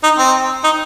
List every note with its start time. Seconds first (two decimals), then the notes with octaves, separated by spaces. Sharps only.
0.03 D#4
0.18 C4
0.64 D#4